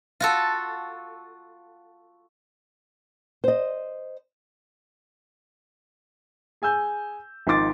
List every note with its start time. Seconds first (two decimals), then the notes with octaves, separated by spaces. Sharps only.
0.20 F4 F#4 A4
3.44 C5 D#5
6.62 G#4 G#5 E6 G6
7.47 G#1 F3 D#4 C6 D6 A6